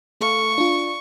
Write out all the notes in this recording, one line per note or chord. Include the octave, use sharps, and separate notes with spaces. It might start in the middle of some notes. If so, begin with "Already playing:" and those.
A3 A4 F5 C#6
D4 F4